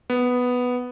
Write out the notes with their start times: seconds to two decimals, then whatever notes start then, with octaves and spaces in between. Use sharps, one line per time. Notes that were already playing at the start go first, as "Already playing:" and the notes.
0.10 B3